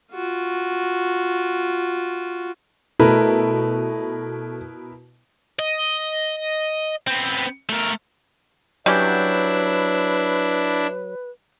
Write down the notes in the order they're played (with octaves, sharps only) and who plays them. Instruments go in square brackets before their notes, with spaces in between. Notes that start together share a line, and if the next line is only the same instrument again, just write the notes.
[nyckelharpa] F4 F#4
[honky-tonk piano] B2 [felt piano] A3 [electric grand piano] E4 A#4 B4
[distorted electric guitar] D#5
B3 C4
A3 A#4
[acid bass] F#3 [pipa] G3 C#4 G4 [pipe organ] D4 E4 [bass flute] B4